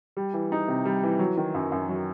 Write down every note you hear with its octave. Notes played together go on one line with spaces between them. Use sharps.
G3
E3
D#4
C3
G3
E3
F#3
D#3
F#2
F#2
F#3